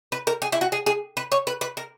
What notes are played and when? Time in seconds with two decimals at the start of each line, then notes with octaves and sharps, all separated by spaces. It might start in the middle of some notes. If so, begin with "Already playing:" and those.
0.12 B4
0.27 A#4
0.42 G#4
0.52 E4
0.61 F#4
0.72 G#4
0.86 G#4
1.17 B4
1.32 C#5
1.47 B4
1.61 B4
1.77 A#4